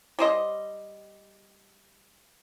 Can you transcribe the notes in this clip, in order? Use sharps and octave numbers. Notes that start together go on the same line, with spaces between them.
G3 C5 D#5